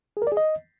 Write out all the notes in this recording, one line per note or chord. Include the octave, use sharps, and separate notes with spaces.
G#4
A#4
D5
G#4
D#5